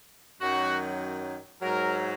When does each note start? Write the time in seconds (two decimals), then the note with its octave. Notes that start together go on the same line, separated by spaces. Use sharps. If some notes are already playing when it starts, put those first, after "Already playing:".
0.39 F#2 D#3 F#3 F#4
1.61 G#2 F#3 A#4